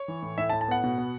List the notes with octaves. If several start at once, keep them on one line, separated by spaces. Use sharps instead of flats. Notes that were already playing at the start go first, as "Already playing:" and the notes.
Already playing: C#5
E3
A2
A2 E5
A5
A2
A5
B3 F#5
B2
B3